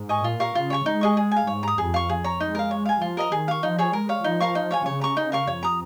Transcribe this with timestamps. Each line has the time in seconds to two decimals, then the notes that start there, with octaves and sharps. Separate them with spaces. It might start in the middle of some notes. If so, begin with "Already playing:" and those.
Already playing: G#2
0.09 D#5 G#5 C#6
0.24 A#2 F4
0.40 A#4 F5 C#6
0.55 C#3 F4
0.70 C#5 G#5 C#6
0.85 G#3 D#4
1.01 G#4 D#5 C#6
1.17 G#4
1.32 F5 G#5
1.47 G#2 C#5
1.63 A#5 D#6
1.78 F2 G#4
1.94 F5 C#6
2.09 G#4
2.24 C#5 A#5
2.40 G#3 D#4
2.55 A#4 F5
2.71 C#5
2.86 F5 G#5
3.01 F3 F4
3.17 A#4 D#5 A#5
3.32 D#3 G#4
3.48 F5 C#6
3.63 F3 D#4
3.78 G#4 C#5 G#5
3.93 G#3 A#4
4.09 C#5 F5
4.24 F3 D#4
4.40 A#4 F5 C#6
4.55 D#4
4.71 C#5 F5 G#5
4.86 C#3 C#5
5.01 A#5 C#6
5.17 D#4
5.32 A#4 F5 C#6
5.47 F2 C#5
5.63 A#5 D#6